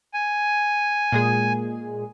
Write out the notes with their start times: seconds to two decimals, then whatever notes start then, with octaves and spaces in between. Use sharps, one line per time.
0.14 G#5
1.12 A#2 G#3 G#4